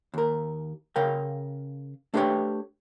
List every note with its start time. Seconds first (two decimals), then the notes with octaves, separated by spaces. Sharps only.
0.14 D#2 A#4
0.96 C#3 A#4 F5 G5
2.14 A3 D4 G4 B4 C#5 G5